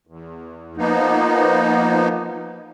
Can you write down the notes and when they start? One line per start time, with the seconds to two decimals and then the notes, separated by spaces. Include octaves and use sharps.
0.07 E2
0.77 F3 A#3 B3 D#4